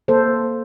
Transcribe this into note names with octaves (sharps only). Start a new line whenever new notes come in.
A#3 A4 C5